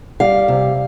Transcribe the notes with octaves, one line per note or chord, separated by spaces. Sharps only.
G3 F5
C3